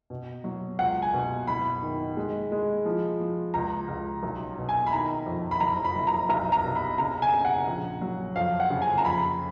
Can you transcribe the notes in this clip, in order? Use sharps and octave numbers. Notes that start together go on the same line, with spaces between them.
B2
F#3
C#2 F#5
G#5
B2
F#1 B5
D#3
G#3
G#3
F3
F3
C#2 A#5
C#2
B1
B2
G#5
B5
D#3 A#5
F2
B5
F#1 A#5
B5
F#1
A#5
B1 A#5
A#5
B2
B5
C#3 A#5
G#5
C#3
F#5
A#1
F#3
F2 F5
F#5
C#3
G#5
A#5
F2 B5